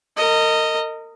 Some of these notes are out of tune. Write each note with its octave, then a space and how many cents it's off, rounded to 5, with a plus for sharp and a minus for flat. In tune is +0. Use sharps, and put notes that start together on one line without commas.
A#4 -35 D#5 +0